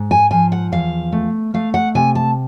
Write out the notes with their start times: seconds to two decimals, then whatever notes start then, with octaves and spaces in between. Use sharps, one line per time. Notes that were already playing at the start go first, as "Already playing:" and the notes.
Already playing: G#2
0.11 G#5
0.31 F3 G#5
0.52 F#5
0.72 E2 F5
1.12 A3
1.54 A3 F5
1.74 F#5
1.95 C3 G#5
2.15 A5